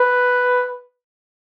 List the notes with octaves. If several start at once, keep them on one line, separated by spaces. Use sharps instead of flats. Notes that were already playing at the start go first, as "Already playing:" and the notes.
Already playing: B4